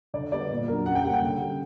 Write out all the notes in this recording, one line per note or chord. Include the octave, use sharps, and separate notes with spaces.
D3 D5
G3 B3 D5
A#2
F#3 A#3 D4 A#4
C#3 F#5
G5
G3 A#3 C#4 F#5
G5
D3
G3 C#4